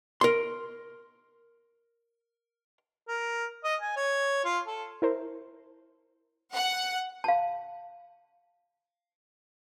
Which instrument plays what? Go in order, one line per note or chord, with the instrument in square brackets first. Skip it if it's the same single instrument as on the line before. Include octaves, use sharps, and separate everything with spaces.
[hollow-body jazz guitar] A#4 C6
[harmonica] A#4
D#5
G#5
C#5
F4
A4
[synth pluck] E4 A#4 C5
[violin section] F#5
[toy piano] F5 A5